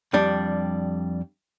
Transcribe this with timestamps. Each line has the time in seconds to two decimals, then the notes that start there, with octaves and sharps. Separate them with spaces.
0.13 F2 G3 D4